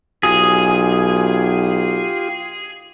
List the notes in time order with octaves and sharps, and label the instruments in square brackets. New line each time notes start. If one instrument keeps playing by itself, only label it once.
[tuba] B1 [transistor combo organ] F4 G4 [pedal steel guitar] G#4